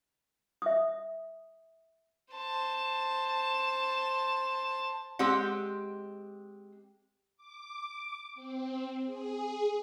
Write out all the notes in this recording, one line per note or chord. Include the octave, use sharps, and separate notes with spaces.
E5 D#6
C5 A5
G#3 C4 G4 F#5
D6
C4
G#4